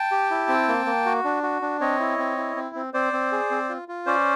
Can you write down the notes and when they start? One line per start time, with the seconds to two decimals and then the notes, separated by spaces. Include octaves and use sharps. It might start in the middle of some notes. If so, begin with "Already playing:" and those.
Already playing: G5 A5
0.11 G4
0.31 E4
0.49 C4
0.68 A#3
0.86 A#3
1.06 F#4
1.25 D4
1.43 F#4
1.62 D4
1.81 C4 C#5 D#5
2.00 E4
2.18 C4
2.37 E4
2.56 C4
2.75 C4
2.94 C4 C5 D5
3.13 C4
3.32 G#4
3.51 C4
3.69 F4
3.88 F4
4.06 C#4 C5 D5